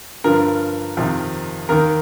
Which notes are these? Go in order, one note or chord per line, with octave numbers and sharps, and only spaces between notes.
G2 D3 F3 A#4
F2 C3 D#3
D#2 D#3 A#4